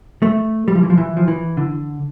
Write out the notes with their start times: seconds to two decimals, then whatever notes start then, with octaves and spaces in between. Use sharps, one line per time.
0.22 A3
0.68 G3
0.75 F3
0.83 E3
0.90 F3
0.98 E3
1.17 F3
1.28 E3
1.57 D3